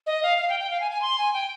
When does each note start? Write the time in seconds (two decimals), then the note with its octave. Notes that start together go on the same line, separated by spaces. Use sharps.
0.06 D#5
0.23 F5
0.38 F5
0.49 G5
0.60 G5
0.71 F5
0.81 G#5
0.91 G#5
1.02 C6
1.18 G#5
1.34 G5